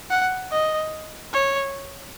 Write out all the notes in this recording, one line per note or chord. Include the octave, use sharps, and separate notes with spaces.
F#5
D#5
C#5